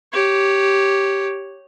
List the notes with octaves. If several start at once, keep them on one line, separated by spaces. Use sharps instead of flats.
G4 C#5